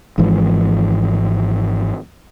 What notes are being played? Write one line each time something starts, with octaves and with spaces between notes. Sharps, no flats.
G#1 G#2 E3 F3